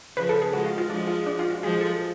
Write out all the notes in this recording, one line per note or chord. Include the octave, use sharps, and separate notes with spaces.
C#3 F3 B4
A4
G#4
F3 G#3 F#4
F4
F4
F3 G#3 D4
F4
D4
F4
F#4
F3 G#3 G#4
A4